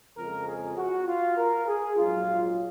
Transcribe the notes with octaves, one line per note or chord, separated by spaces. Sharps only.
F2 C#3 F3 G#3 A#4
G#4
F#4
F4
A#4
G#4
A#1 G#2 F#3 F4